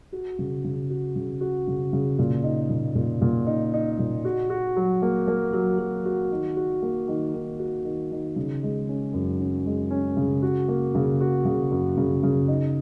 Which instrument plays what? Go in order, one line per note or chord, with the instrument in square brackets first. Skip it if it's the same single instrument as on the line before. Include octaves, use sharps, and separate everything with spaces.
[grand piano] F#4
C#3
C#3
F#4
C#3
F#4
C#3
C#3
A#2
D#4
A#2
A#2
A#2
D#4
D#4
A#2
F#4
F#4
F#3
A#3
A#3
F#3
F#3
F#4
D#3
F#4
A#3
D#3
D#3
F#4
D#3
D#3
C#3
G#3
C#4
F#2
C#4
G#3
C#4
C#3
F#4
A#3
C#3
F#4
C#3
F#2
C#3
C#3
D#4